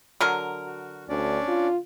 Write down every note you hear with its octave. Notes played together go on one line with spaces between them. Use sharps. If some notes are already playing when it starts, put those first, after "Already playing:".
D3 F#3 A#4
F#4
D2 C#4 D4 D5
F4